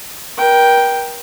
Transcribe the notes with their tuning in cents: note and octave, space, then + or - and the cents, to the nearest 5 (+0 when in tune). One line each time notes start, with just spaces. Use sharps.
A#4 +40 G5 +0